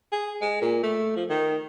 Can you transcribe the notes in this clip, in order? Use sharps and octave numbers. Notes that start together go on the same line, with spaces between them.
G#4
G#3
A#2
A3
F3
D#3